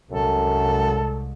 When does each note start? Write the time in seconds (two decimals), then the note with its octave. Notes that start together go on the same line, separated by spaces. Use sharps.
0.12 C2 F#2 G#3 A4